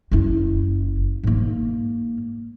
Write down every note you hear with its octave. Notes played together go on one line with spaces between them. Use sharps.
F#1 E4
G#2 A#3